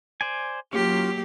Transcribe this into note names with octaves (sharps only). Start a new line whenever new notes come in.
C5 D5 G#5
F#3 A#3 C#4 F4 G4